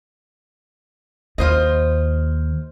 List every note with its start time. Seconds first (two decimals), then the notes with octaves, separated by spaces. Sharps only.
1.38 D#2 F4 C5 D#5